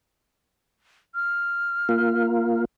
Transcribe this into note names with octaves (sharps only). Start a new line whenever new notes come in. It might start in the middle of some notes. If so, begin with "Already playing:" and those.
F6
A#3 F4